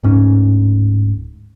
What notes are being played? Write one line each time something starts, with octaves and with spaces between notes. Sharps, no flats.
D1 G#2 C#4